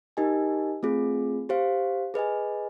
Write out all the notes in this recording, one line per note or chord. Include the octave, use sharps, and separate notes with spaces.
D#4 G4 A#4 D#5 G#5
A3 C4 F4 G#4
G4 C5 F5
G#4 B4 D#5 G#5